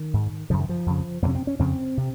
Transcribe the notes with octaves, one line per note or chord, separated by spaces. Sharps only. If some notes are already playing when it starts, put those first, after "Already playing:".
Already playing: D#3
G#2
F#2 C#3 F3
D#3
F3
F2 C#3
F2 C3 A#3 C#4
C4
C#4
F2 C#3 C4
C3